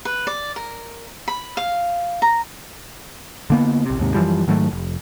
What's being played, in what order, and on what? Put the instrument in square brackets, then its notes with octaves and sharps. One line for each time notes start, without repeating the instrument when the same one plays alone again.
[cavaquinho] B4
D5
A#4
B5
F5
A#5
[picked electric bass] D3 A#3 B3
A#1 C3
D#2 G#2 C3
F#2 E3 F3 G3
G#2 D#3 F#3 A3
F1